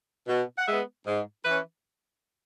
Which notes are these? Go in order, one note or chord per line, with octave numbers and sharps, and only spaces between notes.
B2
F#5
G#3 B3 E5
G#2
E3 C#4 B4